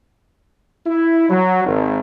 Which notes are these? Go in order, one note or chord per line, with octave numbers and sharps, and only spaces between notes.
E4
F#3
G#1